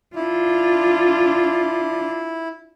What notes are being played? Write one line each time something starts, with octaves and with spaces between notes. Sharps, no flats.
D4 E4 F4